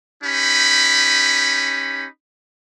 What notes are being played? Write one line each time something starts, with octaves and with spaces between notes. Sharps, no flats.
C#4 D#4 G4 B5